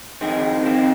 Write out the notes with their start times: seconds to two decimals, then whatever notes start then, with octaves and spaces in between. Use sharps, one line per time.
0.21 F2 D#3 G#3 C4 G#4
0.63 F2 D#3 G#3 C4